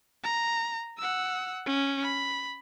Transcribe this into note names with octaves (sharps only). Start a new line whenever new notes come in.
A#5
F#5 E6
C#4
B5